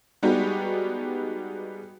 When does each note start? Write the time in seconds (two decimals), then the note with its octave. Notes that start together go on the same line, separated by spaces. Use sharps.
0.23 G3 G#3 B3 D#4 F#4 G4